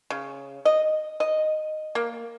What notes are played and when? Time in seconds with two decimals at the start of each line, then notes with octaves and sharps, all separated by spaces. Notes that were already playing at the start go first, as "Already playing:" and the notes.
0.10 C#3
0.65 D#5
1.20 D#5
1.95 A#3